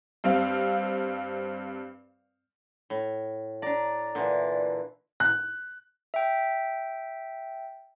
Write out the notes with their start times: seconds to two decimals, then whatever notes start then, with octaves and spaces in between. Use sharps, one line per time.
0.24 G2 C4 F5
2.90 A2
3.62 D4 D5 A#5
4.15 A#2 D3 E3
5.20 F#6
6.14 E5 G5